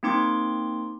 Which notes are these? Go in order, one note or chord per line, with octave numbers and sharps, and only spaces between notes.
A#3 C4 D#4 C6 D6